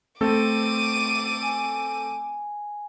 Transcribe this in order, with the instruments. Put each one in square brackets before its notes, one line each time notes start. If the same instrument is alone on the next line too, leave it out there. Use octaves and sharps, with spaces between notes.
[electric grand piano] A3 C4 A4 [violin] D6 D#7
[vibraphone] G#5